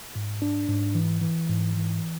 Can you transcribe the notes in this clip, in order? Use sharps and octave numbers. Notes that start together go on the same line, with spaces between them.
G#2
D4
G#2
E3
E3
G#2
E3